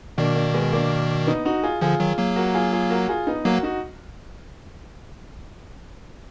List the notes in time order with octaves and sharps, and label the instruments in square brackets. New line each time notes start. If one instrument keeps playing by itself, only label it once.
[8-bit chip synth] B2 D#3 [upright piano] A#3 D4
[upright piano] A#3 D4
G#3 B3
A#3 D4
B3 D#4
D#4 F#4
F4 G#4
[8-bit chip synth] D3 F3 [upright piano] F4 G#4
[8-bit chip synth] D#3 F#3
F#3 A#3
[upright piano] F#4 A#4
F4 G#4
F4 G#4
F#4 A#4
F4 G#4
B3 D#4
[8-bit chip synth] F#3 A#3 [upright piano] F#4 A#4
[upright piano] D#4 F#4